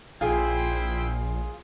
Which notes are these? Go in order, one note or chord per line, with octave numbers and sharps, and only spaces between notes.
A#1 E4 F4 G#4 C5 G5